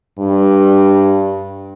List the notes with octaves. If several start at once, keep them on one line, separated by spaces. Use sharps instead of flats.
G2